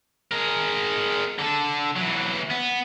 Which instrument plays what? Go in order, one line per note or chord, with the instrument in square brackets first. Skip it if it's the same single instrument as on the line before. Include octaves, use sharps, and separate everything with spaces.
[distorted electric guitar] G#3 A#4
D3 A4
E3 F#3
B3